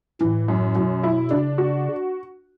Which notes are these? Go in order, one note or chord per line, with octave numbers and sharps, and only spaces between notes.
A2 E3
F#2
F#2 B2
E4
C#3 D4
F#4